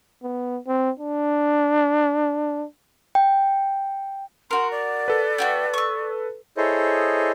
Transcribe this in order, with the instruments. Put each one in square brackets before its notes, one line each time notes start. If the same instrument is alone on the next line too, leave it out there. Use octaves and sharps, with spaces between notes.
[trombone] B3
C4
D4
[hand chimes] G5
[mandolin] F#4 A#4 [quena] C6
[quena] D5
[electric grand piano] A4 B4
[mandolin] A3 F#4 G5
C#6 E6
[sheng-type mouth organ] E4 G#4 A4 C5 C#5 D#5